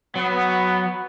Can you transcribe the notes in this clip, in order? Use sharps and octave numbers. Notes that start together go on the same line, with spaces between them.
F#3 B3